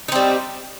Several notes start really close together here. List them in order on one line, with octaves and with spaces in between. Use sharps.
D#4 C4 G3